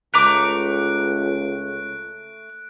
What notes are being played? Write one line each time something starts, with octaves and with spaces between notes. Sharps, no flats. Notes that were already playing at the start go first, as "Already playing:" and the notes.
C#2 A3 A#5 D6 F#6 D7